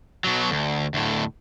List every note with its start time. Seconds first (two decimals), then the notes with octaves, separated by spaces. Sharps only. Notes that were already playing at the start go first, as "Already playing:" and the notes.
0.24 B2 F#3
0.50 D2
0.94 D2 A2